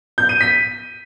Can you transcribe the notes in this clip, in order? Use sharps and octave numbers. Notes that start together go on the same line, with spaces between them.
G6
D#7
B6